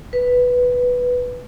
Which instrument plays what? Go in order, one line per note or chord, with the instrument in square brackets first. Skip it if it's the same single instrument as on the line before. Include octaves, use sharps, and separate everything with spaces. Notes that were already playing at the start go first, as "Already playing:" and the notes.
[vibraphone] B4